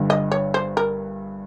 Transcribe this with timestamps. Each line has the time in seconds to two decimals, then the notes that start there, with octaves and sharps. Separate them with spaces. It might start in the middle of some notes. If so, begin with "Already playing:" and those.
Already playing: G1 G2 D3
0.10 D#5
0.32 C#5
0.54 C5
0.77 A#4